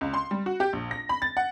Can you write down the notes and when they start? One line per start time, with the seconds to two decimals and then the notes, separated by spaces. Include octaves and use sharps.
0.01 C#2
0.14 C6
0.31 G3
0.46 F#4
0.60 G4
0.73 A#1
0.91 A#6
1.09 B5
1.22 A6
1.37 F#5